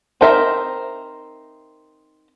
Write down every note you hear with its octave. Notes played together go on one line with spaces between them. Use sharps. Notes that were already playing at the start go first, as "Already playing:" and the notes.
C4 D#4 A#4 E5